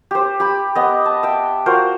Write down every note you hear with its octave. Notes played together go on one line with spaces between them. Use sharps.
G4 C5
G4 B5
B3 D#5
A5
E5 G5
F4 F#4 A#4 C5